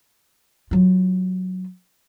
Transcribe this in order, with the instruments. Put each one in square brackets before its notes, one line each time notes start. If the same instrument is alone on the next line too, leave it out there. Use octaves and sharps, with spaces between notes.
[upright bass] F#3 F4